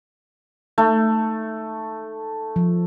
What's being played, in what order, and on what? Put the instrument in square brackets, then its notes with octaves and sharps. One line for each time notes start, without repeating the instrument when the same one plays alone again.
[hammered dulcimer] A3 [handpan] D#4
[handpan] F3